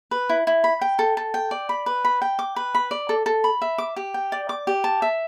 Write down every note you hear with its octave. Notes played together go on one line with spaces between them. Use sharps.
B4
E4
E4
B5
G5
A4
A4
G5
D5
B5
B4
B5
G5
D6
B4
B5
D5
A4
A4
B5
E5
D6
G4
G5
D5
D6
G4
A5
E5